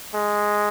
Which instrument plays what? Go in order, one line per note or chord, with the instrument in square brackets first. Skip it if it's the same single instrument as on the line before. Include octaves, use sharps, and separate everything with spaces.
[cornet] G#3